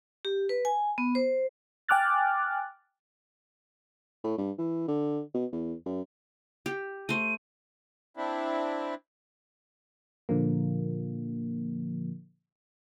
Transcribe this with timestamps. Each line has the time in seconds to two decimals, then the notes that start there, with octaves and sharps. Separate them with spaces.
0.25 G4
0.49 B4
0.65 G#5
0.98 B3
1.15 C5
1.89 G5 G#5 D6 F6 F#6 A6
4.24 A2
4.38 G2
4.58 E3
4.88 D3
5.34 B2
5.52 E2
5.86 F#2
6.66 G4
7.09 A3 C5 D#7
8.17 C4 D4 E4
10.29 A#2 D3 F3 A#3